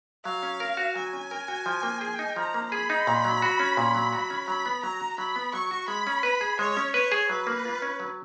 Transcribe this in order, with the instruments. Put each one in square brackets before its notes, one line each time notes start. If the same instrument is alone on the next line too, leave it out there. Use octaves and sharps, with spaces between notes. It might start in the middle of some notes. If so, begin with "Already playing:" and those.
[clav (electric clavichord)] F#3 [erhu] F5
[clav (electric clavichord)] C#4
A#4
F#4
[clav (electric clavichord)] F#3 [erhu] G#5
[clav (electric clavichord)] C#4
A#4
F#4
F3
A#3
G#4
D#4
[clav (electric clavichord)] F3 [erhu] A#5
[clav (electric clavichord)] A#3
[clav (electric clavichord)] G#4 [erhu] B5
[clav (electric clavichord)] D#4
A#2
F#3
F#4
C#4
A#2
F#3
F#4
C#4
[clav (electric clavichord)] F#3 [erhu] B5
[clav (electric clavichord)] B3
[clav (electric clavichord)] F#3 [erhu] A#5
[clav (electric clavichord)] F#4
[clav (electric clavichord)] F#3 [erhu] B5
[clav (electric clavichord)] B3
[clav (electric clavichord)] F#3 [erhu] C#6
[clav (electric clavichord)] F#4
[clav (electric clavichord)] G#3 [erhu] B5
[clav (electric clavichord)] C#4
B4
G#4
[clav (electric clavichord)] G#3 [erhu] C#5
[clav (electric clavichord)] C#4
[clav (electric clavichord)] B4 [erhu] C#5
[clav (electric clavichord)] G#4
[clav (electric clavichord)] F#3 [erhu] B4
[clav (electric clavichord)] A#3
F4
C#4
F#3